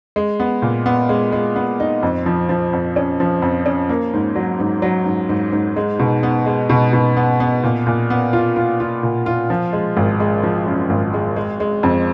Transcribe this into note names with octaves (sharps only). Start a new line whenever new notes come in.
G#3
B3
A#2
B3
G#3
G#3
B3
D#4
F2
F3
F3
F2
C#4
F3
F2
C#4
A#3
G#2
F#3
G#2
F#3
G#2
G#2
G#2
G#3
B2
B3
G#3
B2
B2
B3
B3
A#2
A#2
B3
F4
F4
F4
A#2
F4
F3
G#3
G#1
G#3
F3
F#2
G#1
G#3
G#3
G#3
F2